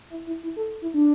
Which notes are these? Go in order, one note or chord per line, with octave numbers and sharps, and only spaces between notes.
E4
E4
E4
A4
E4
D4